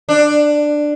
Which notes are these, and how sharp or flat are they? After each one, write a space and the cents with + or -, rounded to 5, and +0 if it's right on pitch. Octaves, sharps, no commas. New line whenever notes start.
D4 +10